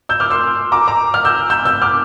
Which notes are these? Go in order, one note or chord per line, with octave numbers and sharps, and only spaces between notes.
E6 G6
D6 F6
C6 E6
A#5 D6
A#5 D6
D6 F6
E6 G6
E6 G6
E6 G6
D6 F6